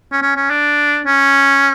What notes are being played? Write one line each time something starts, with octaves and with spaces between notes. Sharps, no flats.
C#4
C#4
C#4
D4
C#4